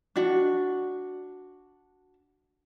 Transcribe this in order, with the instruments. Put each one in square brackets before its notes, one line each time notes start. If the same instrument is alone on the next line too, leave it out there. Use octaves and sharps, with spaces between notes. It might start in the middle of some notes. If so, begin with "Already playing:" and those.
[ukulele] D4 F#4